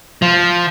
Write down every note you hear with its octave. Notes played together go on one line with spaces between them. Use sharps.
F3